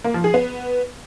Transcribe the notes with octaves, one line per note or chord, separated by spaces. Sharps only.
A#3
F3
G#4
B3